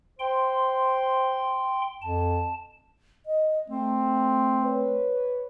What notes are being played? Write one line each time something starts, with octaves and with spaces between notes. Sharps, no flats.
C5 G5 C6
F2 A5
D#5
A3 C4
B4 C#5